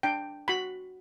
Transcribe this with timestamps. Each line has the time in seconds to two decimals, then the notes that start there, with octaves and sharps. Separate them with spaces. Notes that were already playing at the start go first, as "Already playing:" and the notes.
0.03 D4 G5
0.48 F#4 B5